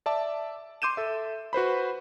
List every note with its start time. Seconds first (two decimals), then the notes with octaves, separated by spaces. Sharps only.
0.06 D5 E5 A5 D6
0.82 C6 D6 G6 D#7 E7
0.97 A4 E5
1.53 F#4 B4 C5 B5